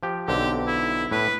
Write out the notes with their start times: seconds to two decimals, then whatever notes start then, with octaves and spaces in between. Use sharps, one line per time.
0.03 F3 G4
0.28 B1 D3 C4 G4
0.67 E4
1.12 A2 B4